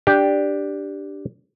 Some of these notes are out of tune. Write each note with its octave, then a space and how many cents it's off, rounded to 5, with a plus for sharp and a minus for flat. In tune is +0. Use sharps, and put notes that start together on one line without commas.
D4 +0 G4 +0